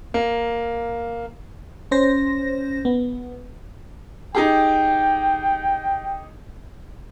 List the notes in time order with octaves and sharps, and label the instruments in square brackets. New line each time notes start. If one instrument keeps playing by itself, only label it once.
[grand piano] A#3
[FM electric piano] C#4 C5 A#6
B3
[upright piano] D#4 G4 G#4 [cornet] G5